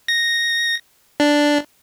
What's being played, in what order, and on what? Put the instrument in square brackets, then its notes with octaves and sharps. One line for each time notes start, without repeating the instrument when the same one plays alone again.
[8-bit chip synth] A#6
D4